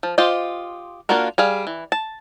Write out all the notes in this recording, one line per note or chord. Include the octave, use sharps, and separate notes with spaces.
F3
F4 G4 C5 D#5
A#3 D4 F4 F#4 A#4
G3 G#4 F5
E3
A5